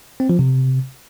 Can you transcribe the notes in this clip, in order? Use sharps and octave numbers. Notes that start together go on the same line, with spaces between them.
C4
F3
C3